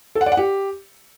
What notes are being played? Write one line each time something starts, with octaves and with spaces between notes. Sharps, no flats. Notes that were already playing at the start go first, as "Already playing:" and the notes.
A4
F#5
D5
F#5
G4